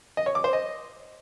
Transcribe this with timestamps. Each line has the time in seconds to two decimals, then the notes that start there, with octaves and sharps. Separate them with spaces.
0.17 D#5
0.26 C#5
0.35 D6
0.44 C5
0.53 D#5